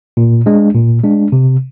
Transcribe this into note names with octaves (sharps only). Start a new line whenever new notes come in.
A#2
G#3 D4
A#2
G#3 D4
C3